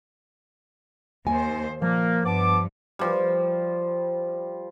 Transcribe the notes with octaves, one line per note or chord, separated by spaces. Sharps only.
D#2 C5 G#5
A#2 F3 A#3
G2 B3 A5 D6
F3 G3